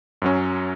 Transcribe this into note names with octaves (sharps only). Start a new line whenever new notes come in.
F#2 F#3 C#4